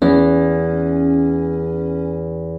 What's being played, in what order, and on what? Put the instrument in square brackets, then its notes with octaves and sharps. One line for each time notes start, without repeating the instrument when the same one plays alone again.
[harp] E2 [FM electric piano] C#4